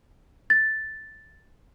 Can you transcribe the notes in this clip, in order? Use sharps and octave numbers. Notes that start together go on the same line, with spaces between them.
A6